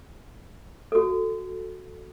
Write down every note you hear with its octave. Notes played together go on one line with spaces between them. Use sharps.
F#4 A4